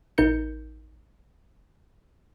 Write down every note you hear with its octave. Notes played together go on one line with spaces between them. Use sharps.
A1 D#4 A#4 G6 C#7